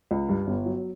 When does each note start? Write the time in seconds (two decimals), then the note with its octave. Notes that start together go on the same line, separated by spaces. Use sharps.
0.11 C#2
0.29 G2
0.47 G1
0.66 F#3